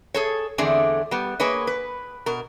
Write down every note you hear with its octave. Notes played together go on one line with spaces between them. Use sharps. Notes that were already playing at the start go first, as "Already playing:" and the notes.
G#4 A4 C#5
E2 D3 A3 C4 G#4 D5
G3 B3
A#3 G#4 B4 C#5 D#5
B4
B2 A#4